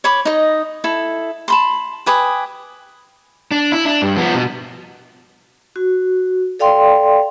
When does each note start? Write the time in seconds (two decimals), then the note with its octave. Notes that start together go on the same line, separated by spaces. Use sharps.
0.04 C#5 B5 D6
0.25 D#4 D#5
0.84 E4 A4
1.48 A5 B5 C6
2.06 G4 B4 G#5 D#6
3.51 D4
3.72 E4
3.85 D4
4.02 G2
4.17 F3 B3
4.34 B2
5.76 F#4
6.59 A4 D5 F5 G5 C6